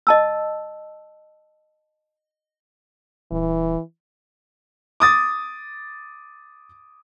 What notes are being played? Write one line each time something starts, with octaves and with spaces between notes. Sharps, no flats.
D#5 A5 E6
D#1 E3
D6 D#6 A6